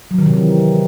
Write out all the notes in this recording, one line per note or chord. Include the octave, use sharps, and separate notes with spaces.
F#3
D#3
C3
E3